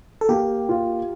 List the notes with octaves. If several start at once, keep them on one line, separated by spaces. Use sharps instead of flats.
A4
A#3 G4
F4